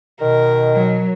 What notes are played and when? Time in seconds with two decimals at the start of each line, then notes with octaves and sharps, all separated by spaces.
0.21 B2 D#3 A#4
0.74 F#3